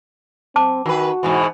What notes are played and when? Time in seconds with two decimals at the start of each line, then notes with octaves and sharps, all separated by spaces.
0.56 C4 A5 D6
0.86 D#3 F#4 B4
1.23 G#2 B2 E3